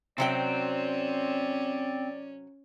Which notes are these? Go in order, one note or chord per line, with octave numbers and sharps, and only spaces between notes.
C3 F#3 C4 C#4 D5 G5